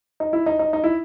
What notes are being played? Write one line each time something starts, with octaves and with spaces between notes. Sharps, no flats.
D#4
E4
D#4
D#4
D#4
E4